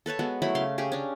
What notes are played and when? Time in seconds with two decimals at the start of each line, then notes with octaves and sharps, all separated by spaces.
0.06 A4 B4 C#5 A5
0.19 G#3 B3 F#4
0.42 F#3 A3 E4 B5
0.55 C#3 F5 C6
0.78 C#4 G4 G#4
0.92 C#4 D4